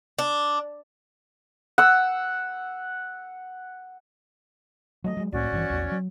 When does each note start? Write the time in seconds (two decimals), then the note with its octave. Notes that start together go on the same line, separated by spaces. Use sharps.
0.19 D4
1.78 F#5 E6
5.04 F#3 G#3 A3 D#5
5.17 F#3 G#3
5.32 C2 A2 A#3 C#4 F#4 D5
5.51 G#1 G2 E3
5.70 A#1 E2
5.92 F#3